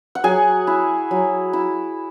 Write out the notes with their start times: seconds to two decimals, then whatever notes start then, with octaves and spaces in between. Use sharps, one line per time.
0.15 F#5
0.24 F#3 G#4 G#5
0.67 E4
1.11 F#3
1.53 E4